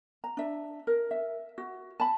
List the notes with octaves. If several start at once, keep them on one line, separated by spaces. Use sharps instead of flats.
A#5
D4 E5
A#4
E5
F#4
A5 B5